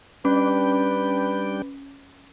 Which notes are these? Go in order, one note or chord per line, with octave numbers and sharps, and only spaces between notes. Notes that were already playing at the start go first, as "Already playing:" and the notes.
G3 C#4 D4 B4 G5